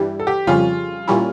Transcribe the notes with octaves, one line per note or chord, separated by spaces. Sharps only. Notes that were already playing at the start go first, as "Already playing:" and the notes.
Already playing: G2 E3 G3
A4
G4
F2 C#3 G3 C#4 F4
A#2 G3 C#4 E4